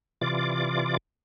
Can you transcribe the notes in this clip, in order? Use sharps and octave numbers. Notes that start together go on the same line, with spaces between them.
C3 E3 F4 D5 D6